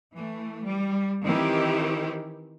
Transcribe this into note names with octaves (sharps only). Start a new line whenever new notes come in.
E3 A3
G3
D#3 E3 C4 E4 G4